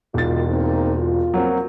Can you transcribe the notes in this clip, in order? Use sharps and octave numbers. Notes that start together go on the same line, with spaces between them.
E1 D#3 F4 A6
A#3 C4 D#4
F4
F#3 A#3 C4